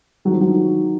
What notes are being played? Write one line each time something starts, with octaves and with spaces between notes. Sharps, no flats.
D#3 F#3
F3
F#3
D#3